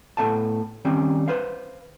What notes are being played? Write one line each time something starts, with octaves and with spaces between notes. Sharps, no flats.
A2 B3 A4 F5 A5
D#3 G3 C4 C#4
B4 C5 F5